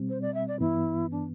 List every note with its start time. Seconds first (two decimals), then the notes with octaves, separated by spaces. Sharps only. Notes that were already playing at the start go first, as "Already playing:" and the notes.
Already playing: B2 G3 C4
0.09 C5
0.22 D5
0.34 E5
0.48 D5
0.60 G2 E3 B3 E4
1.11 D4